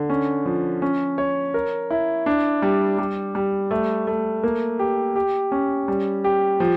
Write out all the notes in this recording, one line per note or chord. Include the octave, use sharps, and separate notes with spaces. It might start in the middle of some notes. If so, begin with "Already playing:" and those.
Already playing: D3
C#4
F3
C#4
C#5
A#4
E4
D4
G3
G3
G3
A3
A3
A#3
G4
G4
C#4
G3
G4
F3